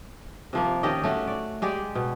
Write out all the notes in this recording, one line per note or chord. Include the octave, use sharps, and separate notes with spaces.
C3 F3 A#3
D#3 C#4 G4 D#5
A3 C#4 F#4
D5
G#3 G4 D5
B2